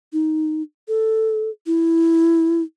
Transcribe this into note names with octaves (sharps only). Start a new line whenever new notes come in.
D#4
A4
E4